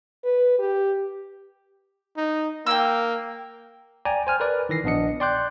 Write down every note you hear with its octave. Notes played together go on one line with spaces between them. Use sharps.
B4
G4
D#4
A#3 G5 E6
D5 G5 G#5 A#5
C5 G#5 F6
A#4 B4 D5
D#3 E3 A#6 C7
A#1 B3 D4 D#5 C#7
D5 G5 C6 D6 F#6 G6